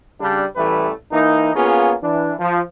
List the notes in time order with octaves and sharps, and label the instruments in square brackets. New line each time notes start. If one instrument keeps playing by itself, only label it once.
[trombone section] C#3 G3 D4
A1 E3 G3 A3 B4
E3 A#3 D#4
A#3 B3 C#4 F4 G#4
E3 D4
F3